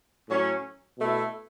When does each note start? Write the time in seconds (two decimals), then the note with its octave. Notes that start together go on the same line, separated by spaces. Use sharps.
0.29 A2 F#3 C#4
0.98 B2 A3 E4